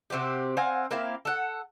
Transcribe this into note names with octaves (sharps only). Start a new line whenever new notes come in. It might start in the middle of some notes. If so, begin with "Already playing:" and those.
C3 C4 F#4 G4
C4 F5 F#5 G#5
A#3 C4 E4 F5
A4 F#5